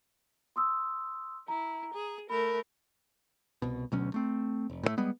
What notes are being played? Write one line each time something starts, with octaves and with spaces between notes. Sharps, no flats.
C6 D#6 E6
E4 A#5
G#4
A3 A#4 B5
C2 B2
D2 B2 F#3 C#4
A3 C4
F1
A2 C3 A3
G3 G#3 B3